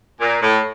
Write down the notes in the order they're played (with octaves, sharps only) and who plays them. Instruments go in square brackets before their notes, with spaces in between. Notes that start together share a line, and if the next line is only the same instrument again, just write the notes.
[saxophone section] A#2
A2